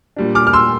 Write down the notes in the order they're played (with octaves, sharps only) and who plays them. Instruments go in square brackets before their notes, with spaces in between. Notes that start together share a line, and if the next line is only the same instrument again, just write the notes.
[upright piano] A#2 G3 D4
D6 F6
F6
C6 E6